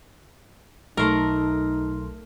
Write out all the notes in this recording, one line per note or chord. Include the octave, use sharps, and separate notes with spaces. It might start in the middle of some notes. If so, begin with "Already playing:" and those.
B1 A3 D#4 A#4 C6